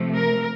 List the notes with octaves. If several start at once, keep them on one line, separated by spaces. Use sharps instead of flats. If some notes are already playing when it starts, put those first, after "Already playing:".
Already playing: C3 F3 A3
A#4